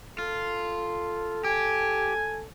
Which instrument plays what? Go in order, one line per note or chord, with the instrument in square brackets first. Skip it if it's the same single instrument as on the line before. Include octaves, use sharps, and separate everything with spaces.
[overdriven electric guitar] F4 [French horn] A4
[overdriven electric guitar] G4 [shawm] G#5